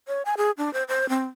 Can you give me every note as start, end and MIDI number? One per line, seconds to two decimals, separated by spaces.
0.08 0.22 73
0.25 0.35 80
0.37 0.51 68
0.58 0.73 62
0.74 0.83 72
0.89 1.09 72
1.09 1.26 60